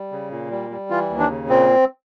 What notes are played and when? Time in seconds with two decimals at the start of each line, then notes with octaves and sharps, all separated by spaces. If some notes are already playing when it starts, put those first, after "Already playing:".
Already playing: G3
0.12 C#3
0.31 A#2
0.51 G3
0.71 G3
0.90 E3 F4
1.10 D#2
1.19 D4
1.30 C#3
1.49 A#2 C4